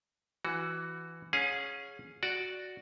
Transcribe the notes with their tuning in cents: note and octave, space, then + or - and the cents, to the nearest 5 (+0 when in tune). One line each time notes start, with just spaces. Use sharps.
E3 +10 F#4 +0
C#4 +0 G#4 +0 F5 +45
F#4 +0 D5 +0